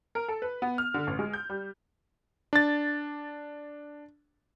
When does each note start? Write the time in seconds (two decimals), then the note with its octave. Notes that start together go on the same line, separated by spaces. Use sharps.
0.15 A#4
0.28 A4
0.42 B4
0.62 B3
0.78 F6
0.94 D3
1.07 A1
1.19 G#3
1.33 G6
1.50 G3
2.53 D4 A6